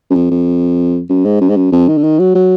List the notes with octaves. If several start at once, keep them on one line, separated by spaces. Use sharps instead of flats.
F#2
F2
F2
F#2
G#2
F#2
G#2
F#2
F2
D#3
D3
D#3
F#3
F#3